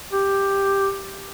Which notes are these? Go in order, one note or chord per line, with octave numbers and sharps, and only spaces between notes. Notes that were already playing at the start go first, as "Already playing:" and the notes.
G4